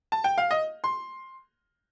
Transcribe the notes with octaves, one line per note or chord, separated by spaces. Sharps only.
A5
G5
F5
D#5
C6